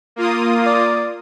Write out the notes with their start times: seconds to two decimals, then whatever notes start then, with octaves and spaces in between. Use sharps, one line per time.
0.16 A#3 F4 D#6
0.66 D5